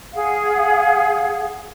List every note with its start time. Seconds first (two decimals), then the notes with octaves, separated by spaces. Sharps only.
0.14 G#4 F5 F#5